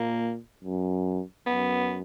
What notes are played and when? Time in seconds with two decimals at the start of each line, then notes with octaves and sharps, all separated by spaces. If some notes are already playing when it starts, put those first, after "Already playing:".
Already playing: A#2 A#3
0.64 F#2
1.46 F#2 B3